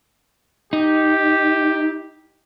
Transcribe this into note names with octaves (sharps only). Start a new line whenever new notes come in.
D#4 G4